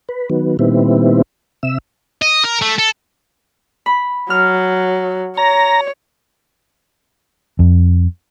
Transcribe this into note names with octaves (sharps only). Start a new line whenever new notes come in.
B4
D#3 F#3 B3
A#2 D#3 G3 B3 C4 E4
C3 E5 E6
D#5
A#4
A3
A4
B5
F#3 F6
C#5 A#5
F2